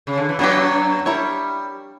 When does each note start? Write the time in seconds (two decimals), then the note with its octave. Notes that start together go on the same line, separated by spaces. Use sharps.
0.07 C#3
0.18 D3
0.29 E3
0.39 F#2 F#3 B3 D4 G4
1.06 G3 E4 A#4 C#5